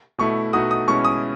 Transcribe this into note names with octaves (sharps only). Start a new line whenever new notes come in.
B2 A3 E4 C#6
B2 A3 D#4 F#4 D#6
D#6
B2 G#3 C#4 E4 C#6
D#6